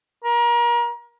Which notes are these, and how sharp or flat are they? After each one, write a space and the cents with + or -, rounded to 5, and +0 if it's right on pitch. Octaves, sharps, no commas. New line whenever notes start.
A#4 +30